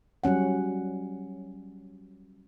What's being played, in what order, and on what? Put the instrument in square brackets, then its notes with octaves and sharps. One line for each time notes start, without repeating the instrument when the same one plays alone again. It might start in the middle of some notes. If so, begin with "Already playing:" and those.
[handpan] F#3 G3 C#4 F#5